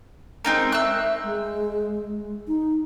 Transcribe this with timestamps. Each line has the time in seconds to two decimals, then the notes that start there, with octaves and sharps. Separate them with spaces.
0.45 G#3 C4 D#4 A#4
0.72 E5 E6 F#6
1.24 G#3
2.48 D#4